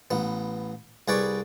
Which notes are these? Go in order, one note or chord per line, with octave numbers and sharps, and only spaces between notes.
A1 B3
C2 G#4 B4 D5 C#6